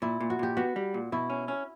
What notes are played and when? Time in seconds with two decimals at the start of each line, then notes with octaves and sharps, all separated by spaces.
0.02 A#2 E4
0.20 A#2
0.30 F#4
0.39 A#2 G4
0.57 B3 F#4
0.76 G3
0.94 A#2
1.12 B2 E4
1.30 C#4
1.48 C#4